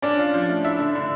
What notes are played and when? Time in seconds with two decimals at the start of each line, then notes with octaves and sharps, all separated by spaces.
0.02 C#4 D4 D5
0.19 F4
0.34 F3
0.49 A3
0.64 D4 E4 E5
0.79 D3
0.95 D3